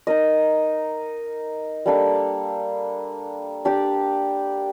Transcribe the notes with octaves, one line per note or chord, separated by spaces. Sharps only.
D#4 A#4 D#5
G3 A#3 D4 A4
D4 G4 D5